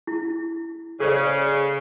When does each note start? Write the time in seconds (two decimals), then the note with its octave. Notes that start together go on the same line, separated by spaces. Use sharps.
0.07 E4
1.00 C#3 A4 C5 D5